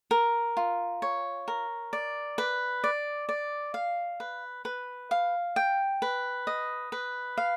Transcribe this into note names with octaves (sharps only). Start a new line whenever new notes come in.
A#4
F4
C#5
A#4
D5
B4
D5
D5
F5
B4
B4
F5
G5
B4
D#5
B4
F5